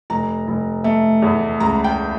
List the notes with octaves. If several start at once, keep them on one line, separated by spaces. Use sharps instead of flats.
F1 A#5
F1
A3
E2
C#2 A#5
G5